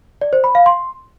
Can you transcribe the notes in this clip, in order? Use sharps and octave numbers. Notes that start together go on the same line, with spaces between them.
D5
C5
B5
F5
C6